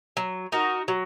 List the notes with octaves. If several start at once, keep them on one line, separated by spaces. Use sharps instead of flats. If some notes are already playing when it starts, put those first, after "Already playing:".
F#3
D#4 F#4 A#4
F#3